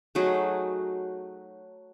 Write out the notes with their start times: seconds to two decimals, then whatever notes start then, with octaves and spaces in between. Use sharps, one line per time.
0.15 F#3 A3 D#4 G#4